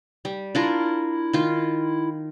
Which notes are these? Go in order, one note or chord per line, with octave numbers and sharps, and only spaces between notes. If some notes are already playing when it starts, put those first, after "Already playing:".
G3
D4 E4 F4 A#4
D#3 F4